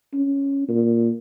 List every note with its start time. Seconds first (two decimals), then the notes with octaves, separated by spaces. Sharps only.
0.14 C#4
0.69 A#2